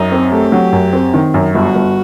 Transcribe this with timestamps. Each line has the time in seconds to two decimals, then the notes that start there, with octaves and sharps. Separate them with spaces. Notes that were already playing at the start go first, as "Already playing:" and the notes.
Already playing: F#2 D#4
0.12 C4
0.32 A3 G4
0.52 F#3
0.72 F#2
0.93 C4
1.14 D#3
1.34 F#2
1.55 G1 F#4
1.75 G1